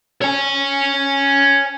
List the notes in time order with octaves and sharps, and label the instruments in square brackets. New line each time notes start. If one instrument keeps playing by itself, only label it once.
[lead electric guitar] C#5 G#5